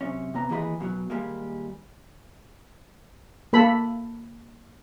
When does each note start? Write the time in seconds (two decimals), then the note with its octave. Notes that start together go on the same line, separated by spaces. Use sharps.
0.01 F#2 C3 C#4
0.34 C3 B3 A#5
0.49 D#2 E3 G#3 G#4 D#5 B5
0.79 F#2 B2 F3 F#3
1.10 D#2 D#3 G3 G#3 A#3
3.53 A#3 A4 B5